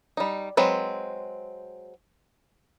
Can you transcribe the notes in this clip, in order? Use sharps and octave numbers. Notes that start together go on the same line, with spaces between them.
G3 D#4
F#3 G#3 C4 B4